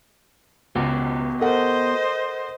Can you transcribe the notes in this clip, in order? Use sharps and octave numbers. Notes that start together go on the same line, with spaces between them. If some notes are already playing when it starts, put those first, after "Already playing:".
C#2 B3 F#4 G4
A4 A#4 C5 D#5 F#5